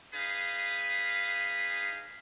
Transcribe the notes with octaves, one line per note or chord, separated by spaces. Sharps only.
D#4 G#4 B4 F5